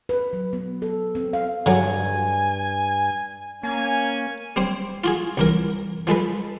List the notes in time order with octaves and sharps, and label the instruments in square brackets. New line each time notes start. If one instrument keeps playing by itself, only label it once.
[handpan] B4
F#3
B3
A4
C4
F5
[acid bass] G2 [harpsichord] D3 F#3 [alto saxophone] G#5
[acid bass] A#3 [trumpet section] C#4 G#5
[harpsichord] G3 C4 C5
F4 F#4 G#4
C2 E3 A#4
F3 G#3 A4 B4